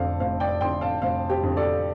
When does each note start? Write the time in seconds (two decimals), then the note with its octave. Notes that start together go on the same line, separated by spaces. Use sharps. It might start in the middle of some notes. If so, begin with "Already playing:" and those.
Already playing: F1 F2 D3 A4 C5 D5 F5
0.20 F1 C5 F5
0.40 D5 G5
0.61 F2 D3 G5 C6
0.81 F5 A5
1.02 F1 C5 F5
1.30 G4 C5
1.43 F2 D3
1.57 A4 D5